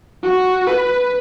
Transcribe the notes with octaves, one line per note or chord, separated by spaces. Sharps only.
F#4
B4